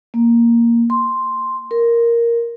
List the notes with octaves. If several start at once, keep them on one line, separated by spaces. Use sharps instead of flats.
A#3
C6
A#4